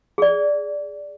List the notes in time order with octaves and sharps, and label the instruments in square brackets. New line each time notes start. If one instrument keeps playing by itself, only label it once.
[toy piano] G#4 D5